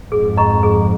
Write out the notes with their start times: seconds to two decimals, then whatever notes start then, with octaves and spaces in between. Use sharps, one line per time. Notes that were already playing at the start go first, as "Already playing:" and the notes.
0.11 F2 G#2 G#4
0.37 D#5 A#5 C#6
0.63 G#4